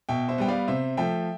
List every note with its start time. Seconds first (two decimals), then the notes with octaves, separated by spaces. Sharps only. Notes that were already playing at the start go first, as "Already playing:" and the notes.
0.09 B2 E5 G5
0.29 C5 E5
0.38 G3 B3 G5
0.48 D5 F5
0.68 C3 C5 E5
0.97 F3 A3 E5 G5